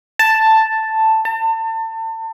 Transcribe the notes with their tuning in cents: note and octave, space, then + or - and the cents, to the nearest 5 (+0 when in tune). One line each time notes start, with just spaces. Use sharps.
A5 +5
A5 +35